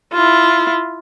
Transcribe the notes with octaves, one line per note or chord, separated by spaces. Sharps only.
E4 F4